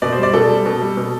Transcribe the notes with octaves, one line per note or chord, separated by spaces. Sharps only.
B2 D5
C5
G3 D5
B2 A4
G3
B2
G3
B2